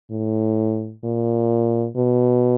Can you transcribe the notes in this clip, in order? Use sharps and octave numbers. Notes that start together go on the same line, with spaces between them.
A2
A#2
B2